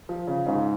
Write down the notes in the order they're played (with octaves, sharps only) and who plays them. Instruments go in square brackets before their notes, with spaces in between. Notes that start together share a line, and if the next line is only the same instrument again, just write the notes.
[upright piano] F3
C#3
[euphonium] G#2 [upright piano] C#3